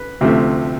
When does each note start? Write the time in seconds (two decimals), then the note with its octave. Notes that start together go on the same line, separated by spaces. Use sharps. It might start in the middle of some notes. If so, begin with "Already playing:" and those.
Already playing: B4
0.21 D2 C3 F3 A3